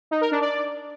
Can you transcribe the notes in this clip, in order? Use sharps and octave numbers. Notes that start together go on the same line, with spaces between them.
D#4
A#4
D4
D5